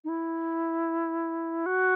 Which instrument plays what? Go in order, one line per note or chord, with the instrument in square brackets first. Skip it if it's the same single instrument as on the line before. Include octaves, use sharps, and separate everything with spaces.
[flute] D#4
E4
F#4